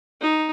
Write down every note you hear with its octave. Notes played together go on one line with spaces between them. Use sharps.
D#4